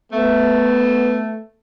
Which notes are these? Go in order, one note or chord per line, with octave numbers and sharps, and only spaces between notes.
A3 B3